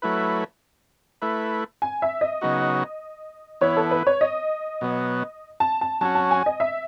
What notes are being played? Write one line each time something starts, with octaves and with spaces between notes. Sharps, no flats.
F#3 A3 E4 B4
A3 E4 B4
G#5
E5
D#5
C#3 F#3 B3 D#4 F#4
E3 B3 E4 C#5
A4
B4
C#5
D#5
B2 F#3 B3
A5
A5
F#3 C#4 F#4 A5
A5
G#5
D#5
E5